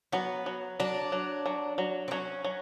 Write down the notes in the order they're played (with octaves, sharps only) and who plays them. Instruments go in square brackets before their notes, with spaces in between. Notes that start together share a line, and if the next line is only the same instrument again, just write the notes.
[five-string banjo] F#3 [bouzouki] B3
[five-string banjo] F#3
[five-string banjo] F#3 [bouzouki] D4
[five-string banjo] F#3
F#3
F#3
[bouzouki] C4
[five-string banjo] F#3 [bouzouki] C#4
[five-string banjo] F#3